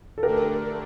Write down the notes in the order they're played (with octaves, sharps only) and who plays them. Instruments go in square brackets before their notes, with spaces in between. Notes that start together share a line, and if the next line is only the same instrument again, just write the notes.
[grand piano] A4
[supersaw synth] D3 A3 D4 [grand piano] G4 A#4